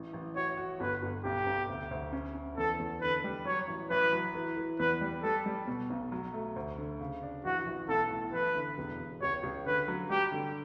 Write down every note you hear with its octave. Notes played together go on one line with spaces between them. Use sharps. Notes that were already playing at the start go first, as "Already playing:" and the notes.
Already playing: A1
A1
F#4 C#5
F#4
G1 B4
G1
B1 G4
B1
D2
D2
C#4
C#4
E2 A4
E2
D3 B4
G3
F#3 C#5
A1
A1 B4
F#3
E3
E3
E2 B4
G3
G3 A4
G3
B2
B1
F#3
A3
D2
D3
C#3
D4
A1 F#4
A1
B1 A4
A2
A1 B4
D3
E1
E1
C#2 C#5
C#2
D3 B4
F#3
G3 G4
D3